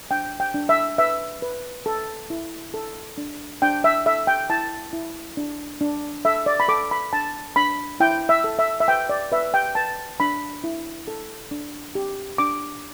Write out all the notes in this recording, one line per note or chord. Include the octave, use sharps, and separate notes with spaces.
D4 G5
G5
D4
E5
B4 E5
B4
A4
E4
A4
D4
D4 G5
E5
A4 E5
G5
E4 A5
E4
D4
D4
A4 E5
D5
B5
A4 D6
B5
D4 A5
D4 B5
E4 G5
E5
A4
E5
E5
B4 G5
D5
B4 E5
G5
B4 A5
D4 B5
E4
A4
D4
G4
D4 D6